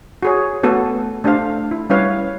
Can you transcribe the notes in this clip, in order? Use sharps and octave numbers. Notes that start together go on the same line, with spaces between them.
F#4 G#4 C#5
A3 B3 F#4 A4
A3 D4 G4 C5 F5
E4
G3 C#4 E4 B4 C#5 F5